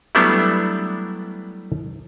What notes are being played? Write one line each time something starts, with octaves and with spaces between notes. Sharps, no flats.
F#3 G3 A3 B3 D4 E4